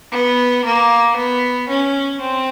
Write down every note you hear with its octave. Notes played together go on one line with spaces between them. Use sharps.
B3
A#3
B3
C#4
C4